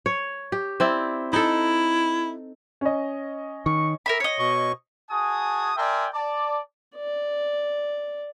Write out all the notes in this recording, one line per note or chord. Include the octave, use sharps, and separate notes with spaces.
C#5
G4
C4 E4 D5
D#4 E4 A4
C#4 D#5
D#3 C#6
A#4 E5 B5
C#5 D#5
B2 C#6
F#4 G#4 G#5 A5 D#6
A#4 D5 E5 G5 G#5 C6
D5 A5
D5